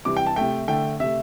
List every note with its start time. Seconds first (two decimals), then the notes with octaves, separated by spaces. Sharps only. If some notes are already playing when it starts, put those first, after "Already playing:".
0.05 C3 E3 G3 D6
0.17 G5
0.26 A5
0.36 C3 A3 G5
0.68 D3 A3 G5
1.00 C3 A3 E5